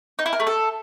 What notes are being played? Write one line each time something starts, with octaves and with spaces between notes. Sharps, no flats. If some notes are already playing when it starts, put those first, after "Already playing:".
D#4
E4
A#4
A3
A4